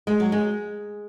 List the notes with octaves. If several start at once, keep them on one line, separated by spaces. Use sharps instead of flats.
G#3
F#3
G#3